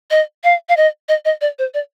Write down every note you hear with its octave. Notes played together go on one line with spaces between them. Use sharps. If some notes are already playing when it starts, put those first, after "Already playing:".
D#5
F5
F5
D#5
D#5
D#5
D5
C5
D5